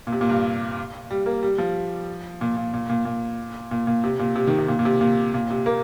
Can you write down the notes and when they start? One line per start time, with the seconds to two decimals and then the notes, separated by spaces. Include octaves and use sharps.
0.07 A#2
0.12 C3
0.21 A#2
0.29 G2
1.11 G3
1.26 A#3
1.43 G3
1.58 F3
2.41 A#2
2.57 A#2
2.74 A#2
2.89 A#2
3.05 A#2
3.71 A#2
3.87 A#2
4.04 C3
4.19 A#2
4.36 C3
4.47 D#3
4.58 C3
4.68 A#2
4.79 A#2
4.85 C3
5.01 A#2
5.34 A#2
5.50 C3
5.66 A#3